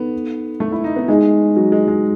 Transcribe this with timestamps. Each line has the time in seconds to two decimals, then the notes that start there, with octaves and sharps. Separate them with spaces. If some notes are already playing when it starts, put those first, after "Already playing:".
Already playing: B3 D#4 A4
0.60 A3
0.72 E4
0.84 D#4
0.96 B3
1.08 G#3 D#4 G#4 D#5 G#5
1.57 F#3
1.72 G#3
1.88 G#3